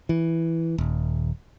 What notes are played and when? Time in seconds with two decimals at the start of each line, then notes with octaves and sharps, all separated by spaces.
0.09 E3
0.78 D#1